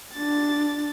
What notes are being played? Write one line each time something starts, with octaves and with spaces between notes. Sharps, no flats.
D4 A6